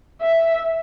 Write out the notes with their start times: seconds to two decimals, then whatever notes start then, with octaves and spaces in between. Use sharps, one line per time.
0.21 E5